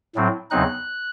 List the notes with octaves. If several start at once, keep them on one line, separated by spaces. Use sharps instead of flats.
A2 F#3 C4
E2 C#3 F#3 C4 D#4 F#6